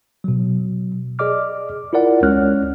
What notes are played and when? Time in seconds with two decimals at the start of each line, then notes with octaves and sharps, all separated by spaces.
0.24 B2 F#3
1.19 G#4 D5 D#5 D6 F6
1.93 E4 F4 A#4 D5 F#5
2.23 C#2 G#3 C#4 C#5 F6 F#6